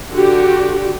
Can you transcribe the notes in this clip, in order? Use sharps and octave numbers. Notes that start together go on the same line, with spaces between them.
D3 F#4 G4